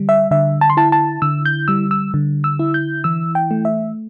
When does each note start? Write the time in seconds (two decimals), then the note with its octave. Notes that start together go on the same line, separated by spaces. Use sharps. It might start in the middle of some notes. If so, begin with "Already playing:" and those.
Already playing: D3 G3
0.09 E5
0.31 D3 E5
0.61 A5
0.70 C6
0.77 E4 A5
0.92 A5
1.22 D3 E6
1.46 G6
1.68 G3 E6
1.91 E6
2.14 D3
2.44 E6
2.59 E4
2.74 G6
3.04 E3 E6
3.35 G5
3.51 A3
3.65 E5